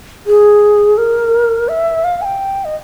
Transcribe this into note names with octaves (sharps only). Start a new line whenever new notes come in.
G#4
A#4
E5
F5
G#5
G5
D#5